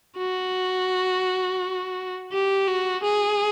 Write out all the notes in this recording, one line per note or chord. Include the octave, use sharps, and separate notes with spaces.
F#4
G4
F#4
G#4